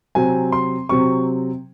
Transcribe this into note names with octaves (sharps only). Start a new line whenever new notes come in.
C3 F#3 C4 G#5
C6
C3 F#3 C4 C#6